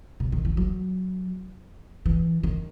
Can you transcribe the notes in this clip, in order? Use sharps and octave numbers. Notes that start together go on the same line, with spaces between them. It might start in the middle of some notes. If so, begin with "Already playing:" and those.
B2
D#3
E3
F#3
E3
D#3